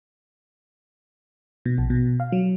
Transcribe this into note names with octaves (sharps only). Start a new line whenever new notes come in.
B2
A#1
B2
F5
F#3